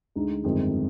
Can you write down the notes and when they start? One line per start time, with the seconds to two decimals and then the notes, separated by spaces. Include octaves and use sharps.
0.15 D2 D3 G#3 D#4
0.44 G1 F2 D#3 G#3